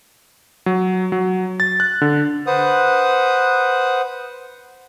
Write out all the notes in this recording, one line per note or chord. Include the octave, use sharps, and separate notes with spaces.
F#3
F#3
A6
F#6
D3
B4 C5 F#5 D#6